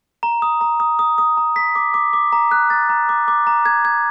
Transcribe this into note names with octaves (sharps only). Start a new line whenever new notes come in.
A#5
D#6
A#5
D#6
D#6
D#6
A#5
B6
D6
D6
D6
A#5
F#6
A6
A#5
D6
D6
A#5
G#6
G#6